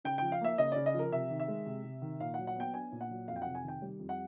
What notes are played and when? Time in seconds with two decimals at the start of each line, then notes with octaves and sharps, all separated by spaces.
0.04 C#3 G5
0.18 F3 G5
0.32 F5
0.41 A#3 E5
0.58 C#3 D#5
0.72 C#3 D5
0.86 D#5
0.94 F3 A#4
1.12 C3 E5
1.30 D#3
1.40 E5
1.48 G#3
1.66 C3
1.84 C3
2.02 D#3
2.20 A#2 F5
2.34 F#5
2.38 F#3
2.47 F#5
2.56 B3 G5
2.74 D4 G#5
2.92 A#2
3.01 F#5
3.10 F#3
3.28 F2 F5
3.36 G5
3.42 C3 F#5
3.55 G#5
3.63 D#3
3.68 G5
3.82 G3
3.99 F2
4.09 F#5